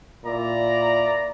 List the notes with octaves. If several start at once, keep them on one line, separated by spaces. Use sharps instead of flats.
A#2 E4 D5 A#5